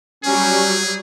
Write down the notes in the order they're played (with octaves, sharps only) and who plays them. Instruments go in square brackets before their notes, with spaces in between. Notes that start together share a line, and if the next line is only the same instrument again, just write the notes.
[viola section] F#3 G3 [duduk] C#4 [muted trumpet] G#4